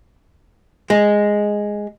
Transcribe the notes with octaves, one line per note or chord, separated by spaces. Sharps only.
G#3